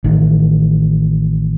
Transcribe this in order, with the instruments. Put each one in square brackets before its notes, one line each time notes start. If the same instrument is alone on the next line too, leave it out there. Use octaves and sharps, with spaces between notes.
[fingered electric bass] A1 D#3